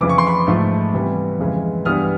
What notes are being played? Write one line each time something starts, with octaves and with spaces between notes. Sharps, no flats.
F2 C#3 E3 D6
C#6
C6
B5 C#6
G#2 F3 A3
C3 E3 G3 B3
F2 C#3 E3 G#3
G2 E3 G3 B3 D#6 F6